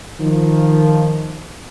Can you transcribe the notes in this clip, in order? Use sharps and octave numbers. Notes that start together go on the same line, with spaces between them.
D#3 F3